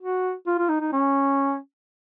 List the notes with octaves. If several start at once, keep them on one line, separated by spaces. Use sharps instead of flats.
F#4
F4
F4
D#4
D#4
C#4